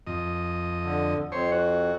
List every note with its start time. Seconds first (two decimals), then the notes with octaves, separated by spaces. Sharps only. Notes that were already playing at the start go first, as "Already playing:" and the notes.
0.07 F2 D#5
0.84 D3
1.32 F2 C5 C#5
1.52 F#4